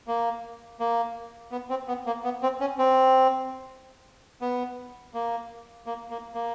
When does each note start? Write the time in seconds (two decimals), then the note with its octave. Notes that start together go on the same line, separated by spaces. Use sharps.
0.07 A#3
0.80 A#3
1.51 B3
1.70 C4
1.88 B3
2.06 A#3
2.24 B3
2.43 C4
2.60 C#4
2.79 C4
4.41 B3
5.14 A#3
5.86 A#3
6.10 A#3
6.34 A#3